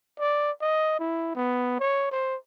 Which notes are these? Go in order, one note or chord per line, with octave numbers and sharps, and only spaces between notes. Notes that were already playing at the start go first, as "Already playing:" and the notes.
D5
D#5
E4
B3
C#5
C5